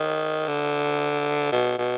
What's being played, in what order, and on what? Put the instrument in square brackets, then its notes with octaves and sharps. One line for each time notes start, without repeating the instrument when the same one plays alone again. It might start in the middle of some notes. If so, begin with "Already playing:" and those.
Already playing: [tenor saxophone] D#3
D3
B2
B2